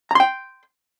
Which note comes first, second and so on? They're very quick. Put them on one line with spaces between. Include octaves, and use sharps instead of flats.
A#5 C6 G5